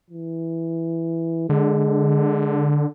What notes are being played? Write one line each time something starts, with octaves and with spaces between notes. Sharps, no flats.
E3
D3 G#3